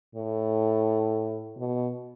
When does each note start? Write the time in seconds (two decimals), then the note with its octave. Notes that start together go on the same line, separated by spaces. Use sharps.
0.15 A2
1.58 B2